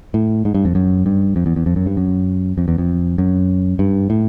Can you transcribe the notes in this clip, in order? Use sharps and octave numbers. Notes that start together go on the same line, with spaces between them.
A2
G#2
G2
F2
F#2
G2
F2
E2
E2
F2
F#2
G2
F#2
F2
E2
F2
F#2
G2
A2